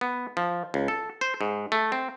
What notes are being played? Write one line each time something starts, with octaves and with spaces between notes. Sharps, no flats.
B3
F3
C#2
A4
C5
G#2
A3
C4